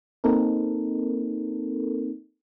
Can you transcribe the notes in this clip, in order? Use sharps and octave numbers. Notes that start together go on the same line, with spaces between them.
A#3 C4 D#4 A4 A#4